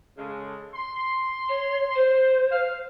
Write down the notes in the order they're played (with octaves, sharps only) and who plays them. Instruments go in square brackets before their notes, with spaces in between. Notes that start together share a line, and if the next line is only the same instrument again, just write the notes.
[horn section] C#3 G#3 A4
C6
[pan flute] C#5
C5
[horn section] F5